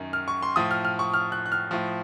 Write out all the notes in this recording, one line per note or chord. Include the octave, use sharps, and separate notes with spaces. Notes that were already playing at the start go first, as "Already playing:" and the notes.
Already playing: F#2 D#3
F6
C#6
C6
A2 F3 D#6
F6
F6
C#6
F6
F#6
F#6
F6
A2 F3